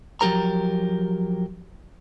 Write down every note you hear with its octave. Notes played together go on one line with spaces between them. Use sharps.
F3 F#3 G4 A#4 A#5